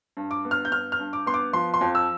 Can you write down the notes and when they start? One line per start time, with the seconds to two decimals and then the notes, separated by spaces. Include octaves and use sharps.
0.17 G2
0.31 D6
0.45 B3
0.51 F6
0.65 G6
0.71 G2 F6
0.92 F6
0.99 G2
1.13 D6
1.26 B3 C6
1.34 D6
1.53 F3 C6
1.74 C6
1.81 F2
1.95 E6